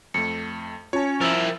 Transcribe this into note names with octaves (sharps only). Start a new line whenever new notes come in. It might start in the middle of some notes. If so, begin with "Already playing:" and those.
F2 A3 C#7
C#4 F4 C#5 A5
F3 E4 A#4 E6 A6